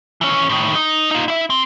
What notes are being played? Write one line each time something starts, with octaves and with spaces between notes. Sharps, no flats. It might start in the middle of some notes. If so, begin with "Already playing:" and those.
E3 C#4
A2 D#3
D#4
D#4 F4
E4 E5
C4